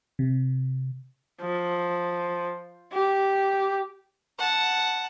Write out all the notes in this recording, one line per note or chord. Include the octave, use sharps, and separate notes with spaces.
C3
F3
G4
F#5 A5